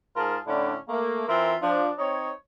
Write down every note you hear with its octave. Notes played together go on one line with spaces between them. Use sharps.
G#2 F4 G#4 A#4 A5
A2 D3 C#4 D4 E4
A3 A#3
E3 C4 F4 A#4 E5
F3 D4
C4 D#4 C#5